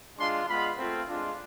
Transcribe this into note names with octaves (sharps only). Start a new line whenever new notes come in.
G#3 D4 F4 C6
G#3 B3 F4 B5
A3 C4 F4
G#3 D4 F4